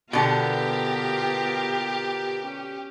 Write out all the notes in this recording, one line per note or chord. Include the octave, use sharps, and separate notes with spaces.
B2 D3 B3 F4 G4 A#4
C#4